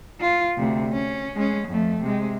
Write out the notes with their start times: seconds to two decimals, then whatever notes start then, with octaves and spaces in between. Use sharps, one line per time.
0.21 F4
0.57 D2 C3
0.93 C#4
1.36 G#3 C#4
1.68 F2 A3
2.02 C3 G#3